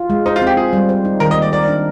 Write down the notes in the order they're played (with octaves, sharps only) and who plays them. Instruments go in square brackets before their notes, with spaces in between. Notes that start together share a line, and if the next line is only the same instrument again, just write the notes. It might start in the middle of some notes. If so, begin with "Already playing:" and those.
Already playing: [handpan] F4
G#3
[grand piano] D#4 [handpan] C5
[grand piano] F4
[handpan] C4
[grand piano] G4
[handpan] F4 [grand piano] G#4
[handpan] G3
C5
D#4
[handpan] D#3 [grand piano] A#4
[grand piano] D#5
[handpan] A#3
[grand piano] D5
[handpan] A#4 [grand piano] D5
[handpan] D4